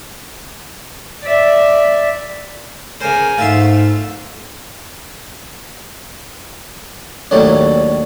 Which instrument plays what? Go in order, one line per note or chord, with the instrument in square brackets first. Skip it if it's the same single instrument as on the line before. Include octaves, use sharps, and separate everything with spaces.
[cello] D5 E5
[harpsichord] C#3 C5 [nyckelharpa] A#4 G#5
[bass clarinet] G#2 [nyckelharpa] A3 [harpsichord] F4 E5 C6
[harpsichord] D#2 A2 F#3 D4